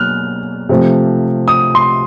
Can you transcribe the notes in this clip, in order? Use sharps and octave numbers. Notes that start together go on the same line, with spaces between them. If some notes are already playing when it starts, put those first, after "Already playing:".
Already playing: B2 F#3 A#3 F6 F#6
C3 F3 A3
D#6
C6